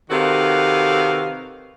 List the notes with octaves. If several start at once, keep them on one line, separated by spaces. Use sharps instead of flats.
C3 D#3 F#4 A4 B4 F5